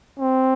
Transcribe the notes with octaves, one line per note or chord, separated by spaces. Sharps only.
C4